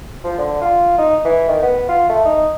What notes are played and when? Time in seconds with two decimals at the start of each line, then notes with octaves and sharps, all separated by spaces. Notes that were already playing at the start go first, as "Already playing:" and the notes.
0.24 F3
0.38 D3
0.62 F4
0.98 D#4
1.25 E3
1.48 D#3
1.62 B3
1.89 F4
2.09 A3
2.25 D#4